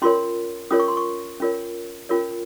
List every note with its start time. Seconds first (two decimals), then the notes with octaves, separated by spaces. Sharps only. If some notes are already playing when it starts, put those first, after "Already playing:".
0.02 C#4 F4 A#4 C#5 C6
0.71 C#4 F4 A#4 C#5 D#6
0.80 C#6
0.88 C6
0.97 C#6
1.40 C#4 F4 A#4 C#5
2.09 C#4 F4 A#4 C#5